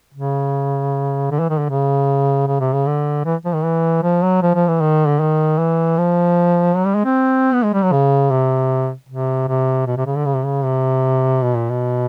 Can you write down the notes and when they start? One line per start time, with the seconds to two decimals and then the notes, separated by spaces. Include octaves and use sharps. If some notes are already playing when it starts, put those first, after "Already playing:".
0.14 C#3
1.31 D3
1.40 E3
1.50 D#3
1.59 D3
1.70 C#3
2.48 C#3
2.60 C3
2.73 C#3
2.86 D3
3.25 E3
3.45 F3
3.54 D#3
3.64 E3
4.03 F3
4.23 F#3
4.42 F3
4.55 F3
4.68 E3
4.81 D#3
5.08 D3
5.20 D#3
5.58 E3
5.98 F3
6.76 F#3
6.85 G3
6.95 G#3
7.05 C4
7.53 B3
7.63 G#3
7.73 G3
7.82 F#3
7.92 C#3
8.31 C3
9.09 C3
9.48 C3
9.87 B2
9.97 C3
10.06 C#3
10.16 D3
10.26 C#3
10.36 C3
10.44 C#3
10.64 C3
11.42 B2
11.56 A#2
11.70 B2